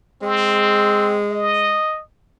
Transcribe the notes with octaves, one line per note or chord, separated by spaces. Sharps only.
G#3 C4
D#5